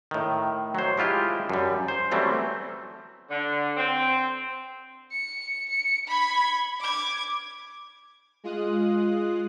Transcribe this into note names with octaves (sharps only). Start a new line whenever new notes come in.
A2 D#3
F#3 C5
G#3 E4 F4 G4
F#2 G3
C5
E3 F#3 G3 A3 C4
D3
C4
C#7
C#7
B5 G#6
D6 G#6
G#3 F4 D#6 F#6